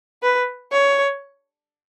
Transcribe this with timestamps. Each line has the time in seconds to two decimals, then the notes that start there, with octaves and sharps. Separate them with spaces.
0.23 B4
0.72 C#5